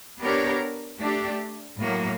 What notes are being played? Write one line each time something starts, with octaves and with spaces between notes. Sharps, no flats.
B3 D4 G4 A#4 C#5
A3 D4 G4
A2 F#3 A#3